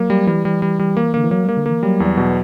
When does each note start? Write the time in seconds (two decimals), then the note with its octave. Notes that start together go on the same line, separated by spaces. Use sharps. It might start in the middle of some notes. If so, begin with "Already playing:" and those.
Already playing: F#3 A#3
0.10 G3
0.27 E3 G3
0.45 G3
0.62 G3
0.79 G3
0.97 A#3
1.14 D3 A#3
1.24 E3
1.31 F#3 A#3
1.44 G3 A#3
1.57 D3
1.66 E3 A#3
1.83 F#3 G3
2.00 E2
2.17 B2